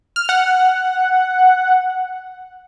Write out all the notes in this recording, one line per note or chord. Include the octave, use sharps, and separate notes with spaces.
F6
F#5